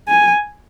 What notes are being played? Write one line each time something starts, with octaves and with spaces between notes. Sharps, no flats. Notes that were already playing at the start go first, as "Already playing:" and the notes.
G#5